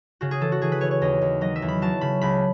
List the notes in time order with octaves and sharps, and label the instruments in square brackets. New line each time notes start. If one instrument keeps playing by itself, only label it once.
[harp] C#3 F#4
G#4
E3 A4
F#4
E3 G#4
B4
E3 C#5
C#5
D#2 D#5
D#2
F#3 D#5
E5
E2
B5
F#3 A5
C#3 B5
C#2 B5